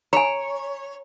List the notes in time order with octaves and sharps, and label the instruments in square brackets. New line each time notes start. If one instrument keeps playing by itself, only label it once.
[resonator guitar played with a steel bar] C#5 [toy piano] G#5 A#5